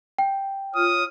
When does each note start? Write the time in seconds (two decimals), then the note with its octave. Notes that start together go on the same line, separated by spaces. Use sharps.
0.18 G5
0.75 F4 C#5 D#6 F6